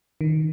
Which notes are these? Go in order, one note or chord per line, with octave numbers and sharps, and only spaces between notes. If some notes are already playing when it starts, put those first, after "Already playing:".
D#3